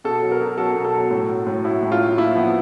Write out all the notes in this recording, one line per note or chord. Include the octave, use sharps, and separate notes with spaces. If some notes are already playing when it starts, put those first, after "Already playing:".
B2 A4
F#3
A#4
B2
F#3 A4
B2
A4
F#3
A2
F#3
A2
F#3 E4
A2
F4
F#3
A#2 E4
F3 B3